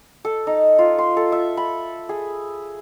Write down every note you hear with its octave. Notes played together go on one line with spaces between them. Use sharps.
A4
D#4
F4
C6
A4
E5
B5
G#4